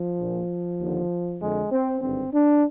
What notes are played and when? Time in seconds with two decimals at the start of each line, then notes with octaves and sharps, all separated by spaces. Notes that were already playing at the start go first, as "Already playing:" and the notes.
Already playing: F3
0.19 A#1 A#2
0.80 D#2 D3
1.41 F2 D3 G#3
1.71 C4
2.02 G#1 G2 D3 C4
2.32 D4